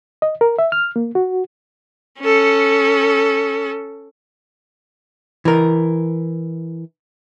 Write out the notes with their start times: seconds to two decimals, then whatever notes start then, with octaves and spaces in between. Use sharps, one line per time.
0.22 D#5
0.41 A#4
0.59 E5
0.72 F6
0.96 A#3
1.15 F#4
2.20 C#4 A4
5.45 E3 A#4